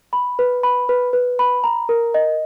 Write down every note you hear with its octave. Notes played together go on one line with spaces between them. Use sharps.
B5
B4
B5
B4
B4
B5
A#5
A#4
D#5